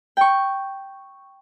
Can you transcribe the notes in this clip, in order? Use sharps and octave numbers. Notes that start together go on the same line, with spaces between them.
G5 C#6